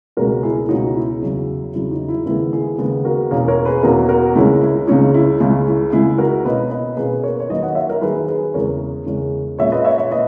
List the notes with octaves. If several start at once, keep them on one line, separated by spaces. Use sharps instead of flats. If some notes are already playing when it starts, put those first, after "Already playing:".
C#2 B2 G#3 C#4 F#4 A#4
E4 G#4
G#4
C#2 B2 G#3 C#4 D#4 F#4
E4
E2 C#3 F#3
E2 C#3 F#3 E4
D#4
E4
D#2 C#3 G#3 B3 E4
E4 G#4
D#2 C#3 G#3 B3
F#4 A#4
E2 B2 A#3 C#4
A#4 C#5
G#4 B4
E2 B2 A#3 C#4 F#4 A#4
F#4 A#4
C#2 C#3 G#3 C#4 E4
E4
C#2 C#3 G#3 C#4 D#4
E4
C#2 C#3 G#3 E4
E4
C#2 C#3 G#3 E4 G#4
F#4 A#4
B2 A#3 C#4 B4 D#5
B4 D#5
B2 A#3 C#4 G#4 B4
A#4 C#5
C#5
D#2 D#3 F#3 B4 D#5
D#5 F#5
C#5 E5
A#4 C#5
D#2 D#3 F#3 G#4 B4
G#4 B4
E2 C#3 G#3 C#4 A#4 C#5
E2 C#3 G#3 C#4
A#2 G#3 C#4 C#5 E5
B4 D#5
C#5 E5
C#5 E5
A#2 B4 D#5